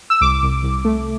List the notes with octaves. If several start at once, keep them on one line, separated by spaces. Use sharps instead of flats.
E6
C2 D6
C2
C2
A3